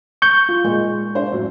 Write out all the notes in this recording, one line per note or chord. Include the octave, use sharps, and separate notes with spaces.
C#6 G6
F4
A#2 G#3
D4 C5 D5
F#2 A2 F#3